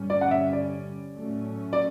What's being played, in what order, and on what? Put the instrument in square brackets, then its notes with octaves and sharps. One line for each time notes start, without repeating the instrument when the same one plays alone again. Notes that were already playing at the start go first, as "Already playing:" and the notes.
Already playing: [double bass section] G2 D3 G3 C#4
[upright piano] D5
F#5
E5
D5
[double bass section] A2 F#3 A3 C#4
[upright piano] D5